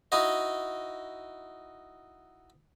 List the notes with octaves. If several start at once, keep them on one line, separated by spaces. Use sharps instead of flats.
D#4 E4 F#4 D#5